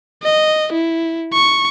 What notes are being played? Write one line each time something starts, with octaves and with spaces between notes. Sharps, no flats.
D#5
E4
C#6